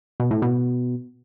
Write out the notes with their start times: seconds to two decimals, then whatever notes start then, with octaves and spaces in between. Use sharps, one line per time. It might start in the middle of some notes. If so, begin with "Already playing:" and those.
0.20 B2
0.31 A2
0.42 B2